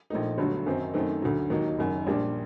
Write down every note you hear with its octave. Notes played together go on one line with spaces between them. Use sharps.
A#1 A#2 A3 D#4
G1 G2 D3 F#3 A3
F#2 D#3 F#3 C4 D#4
F#2 D#3 A3 C4 D#4
D2 D3 F#3
D#2 D#3 F#3 A#3 D#4
F#1 F#2 D#3
A#1 A#2 G3 D4